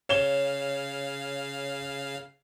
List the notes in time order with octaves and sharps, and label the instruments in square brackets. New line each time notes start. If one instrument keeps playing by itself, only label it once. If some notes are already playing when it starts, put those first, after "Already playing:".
[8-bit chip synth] C#3 F5 [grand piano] C#5 E7 G7